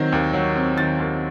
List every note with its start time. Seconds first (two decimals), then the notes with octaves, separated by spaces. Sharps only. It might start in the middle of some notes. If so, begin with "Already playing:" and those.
Already playing: D#3 F#3 C4
0.12 D#2
0.33 F#3
0.56 C4
0.78 D#3 A6
1.00 D#2